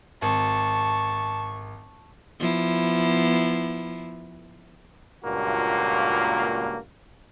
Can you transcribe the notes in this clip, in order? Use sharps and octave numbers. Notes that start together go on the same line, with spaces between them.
G#1 A5 C#6
F3 B3 E4
C#2 G2 A#2 A#3 F#4